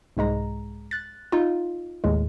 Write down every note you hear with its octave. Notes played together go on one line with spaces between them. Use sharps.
C2 G#2 G#3 A#5
F#6 A6
D#4 F4
D#2 A2 G#3